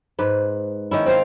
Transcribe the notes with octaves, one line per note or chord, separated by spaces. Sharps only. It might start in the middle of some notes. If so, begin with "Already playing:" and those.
G#2 B4
D#3 C#4 E4
C4 C5 F5